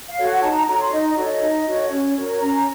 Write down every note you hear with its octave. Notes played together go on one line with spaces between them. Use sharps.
F5
F#4 A4 C#5
F#5
D#4 A5
A#5
F#4 A4 C#5 A#5
C6
D#4 D#5
D#5
F#4 A4 C#5
D#5
D#4
F#4 A4 C#5
C#4 C#5
C#5
F#4 A#4 C#5
C#5
C#4 A#5